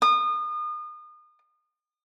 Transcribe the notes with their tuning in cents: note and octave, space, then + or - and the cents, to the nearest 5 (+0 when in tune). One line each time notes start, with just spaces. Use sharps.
D#6 -35